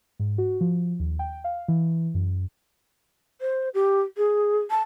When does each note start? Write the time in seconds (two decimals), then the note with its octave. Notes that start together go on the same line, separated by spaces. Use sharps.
0.19 G#2
0.38 F#4
0.61 F3
1.00 D#2
1.19 G5
1.44 F5
1.68 E3
2.15 F#2
3.41 C5
3.74 G4
4.17 G#4
4.71 A5